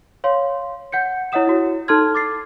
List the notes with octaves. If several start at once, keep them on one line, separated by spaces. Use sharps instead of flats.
C#5 F5 C6
F#5 G6 C#7
E4 C#5 D#5 F#5 D#6 E7
E4 F#4 C#5
D#4 A4 A5 C6 F6 G#6
D6 A6 C7